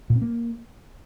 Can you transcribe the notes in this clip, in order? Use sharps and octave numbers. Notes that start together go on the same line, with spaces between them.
A#2
C4
A#3